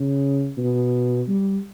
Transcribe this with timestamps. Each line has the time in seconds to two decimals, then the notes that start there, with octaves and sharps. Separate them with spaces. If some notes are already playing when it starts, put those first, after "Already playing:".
Already playing: C#3
0.58 B2
1.28 G3